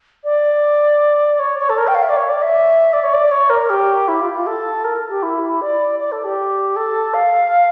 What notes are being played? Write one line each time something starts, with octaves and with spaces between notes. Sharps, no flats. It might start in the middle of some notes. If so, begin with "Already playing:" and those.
D5
C#5
C#5
A4
A#4
G5
F5
E5
D5
C#5
D5
E5
D5
C#5
D5
C#5
A#4
G4
E4
F4
F4
A4
A#4
G4
E4
D5
D5
A4
G4
A4
F5